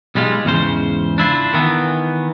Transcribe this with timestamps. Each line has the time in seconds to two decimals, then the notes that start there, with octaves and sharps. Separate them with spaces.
0.15 B1 G3 G#3 F4
0.45 E2 G#2 C#3 C5
1.18 D4 E4 F4
1.53 D#3 E3 B3